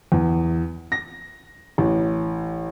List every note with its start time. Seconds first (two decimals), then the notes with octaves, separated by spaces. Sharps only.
0.12 E2
0.92 A#6
1.78 A1